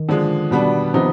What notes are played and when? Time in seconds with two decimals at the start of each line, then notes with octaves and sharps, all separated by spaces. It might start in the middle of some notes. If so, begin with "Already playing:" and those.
Already playing: D#3
0.09 D3 F3 G#3
0.51 B2 G3 B3 D4
0.94 C3 D#3 F3 B3 D#4